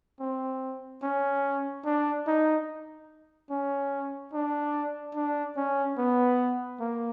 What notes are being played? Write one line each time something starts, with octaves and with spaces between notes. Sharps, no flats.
C4
C#4
D4
D#4
C#4
D4
D4
C#4
B3
A#3